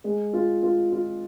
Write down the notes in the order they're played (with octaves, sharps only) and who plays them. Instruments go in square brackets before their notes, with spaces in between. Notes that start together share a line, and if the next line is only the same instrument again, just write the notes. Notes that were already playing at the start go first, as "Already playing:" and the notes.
[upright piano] G#3
F4
F4
F4